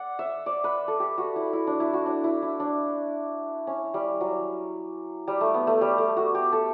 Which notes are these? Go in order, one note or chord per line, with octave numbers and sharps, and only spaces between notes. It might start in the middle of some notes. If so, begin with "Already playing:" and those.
Already playing: D5 F#5
E5
D5
B4
A4
G4
F#4
E4
E4
D4
E4
F#4
D4
E4
E4
D4
C#4
G3
F#3
G3
A3
B3
A3
G3
A3
F#4
G4
A4